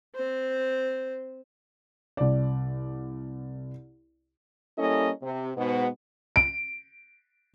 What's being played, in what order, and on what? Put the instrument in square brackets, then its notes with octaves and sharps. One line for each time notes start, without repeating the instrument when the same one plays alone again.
[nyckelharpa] C4 C5
[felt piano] C2 D5
[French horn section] G3 A#3 C#4 E4 A4 D#5
C3
G#2 B2 B3
[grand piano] D7